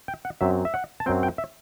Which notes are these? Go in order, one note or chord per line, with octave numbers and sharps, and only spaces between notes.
G5
F#5
F#2 F#3 C4 E5
E5
F#5
A5
F#2 F#3 C4 G5
G5
E5